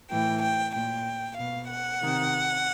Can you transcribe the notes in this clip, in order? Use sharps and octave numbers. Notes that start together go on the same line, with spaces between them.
A2 E3 G5
G5
A#2 G5
B2 F5
F#5
C3 D#3